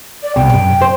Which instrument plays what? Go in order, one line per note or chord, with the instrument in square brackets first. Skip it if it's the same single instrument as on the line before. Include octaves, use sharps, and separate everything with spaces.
[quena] D5
[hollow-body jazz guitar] C2 B2 [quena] G5
[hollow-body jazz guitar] F#2
C5